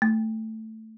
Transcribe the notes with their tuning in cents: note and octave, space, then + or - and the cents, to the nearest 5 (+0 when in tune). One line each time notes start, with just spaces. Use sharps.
A3 +5